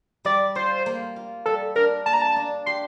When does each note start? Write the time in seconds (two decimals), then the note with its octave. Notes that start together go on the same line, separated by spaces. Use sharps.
0.25 G3 D5
0.55 F4 C5
0.86 A#3
1.16 F4
1.46 G3 A4
1.76 D4 A#4
2.06 A#3 A5
2.13 A#5
2.22 A5
2.36 D4
2.66 G4 C6